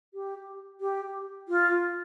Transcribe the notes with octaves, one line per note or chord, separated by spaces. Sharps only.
G4
G4
F4